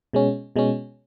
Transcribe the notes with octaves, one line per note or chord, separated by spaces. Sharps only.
B2 G#3 C#4
B2 G#3 C#4